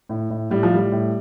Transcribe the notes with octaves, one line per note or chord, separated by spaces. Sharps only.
A2
A2
A2 G3
F3
A2 G3
A2